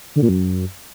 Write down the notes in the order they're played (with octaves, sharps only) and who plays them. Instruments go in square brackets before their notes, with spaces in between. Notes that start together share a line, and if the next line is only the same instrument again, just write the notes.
[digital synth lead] D3
A#2
F#2